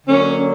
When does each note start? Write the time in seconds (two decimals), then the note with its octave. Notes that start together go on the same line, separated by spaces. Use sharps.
0.07 D3 F#3 A#3 C#4